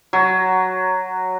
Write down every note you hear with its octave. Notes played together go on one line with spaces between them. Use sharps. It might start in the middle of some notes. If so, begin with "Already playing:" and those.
F#3